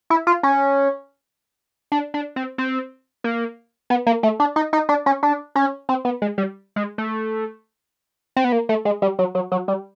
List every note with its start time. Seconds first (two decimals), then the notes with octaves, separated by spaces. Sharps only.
0.10 E4
0.27 F4
0.43 C#4
1.92 D4
2.14 D4
2.36 C4
2.58 C4
3.24 A#3
3.90 B3
4.07 A#3
4.23 A3
4.40 D4
4.56 D#4
4.73 D#4
4.89 D4
5.06 C#4
5.23 D4
5.56 C#4
5.89 C4
6.05 B3
6.22 G#3
6.38 G3
6.76 G#3
6.98 A3
8.37 C4
8.44 B3
8.52 A#3
8.69 A3
8.85 G#3
9.02 G3
9.19 F#3
9.35 F#3
9.52 F#3
9.68 G3